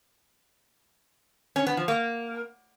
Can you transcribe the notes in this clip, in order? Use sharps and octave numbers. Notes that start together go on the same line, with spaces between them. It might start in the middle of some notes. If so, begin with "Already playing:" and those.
C#4
B3
F3
A#3